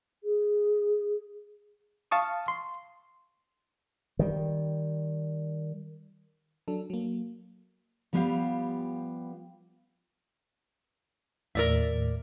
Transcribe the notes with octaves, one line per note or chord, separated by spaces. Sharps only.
G#4
F5 A5 C#6 D#6
C6
D#3 G3
F#3 D4 A4
F#3 A#3
F3 G3 B3 G4 F5
D#2 A2 A#4 D5 E5